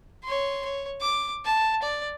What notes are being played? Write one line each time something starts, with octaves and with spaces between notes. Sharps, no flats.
C#5 C6
C#5
D6
A5
D5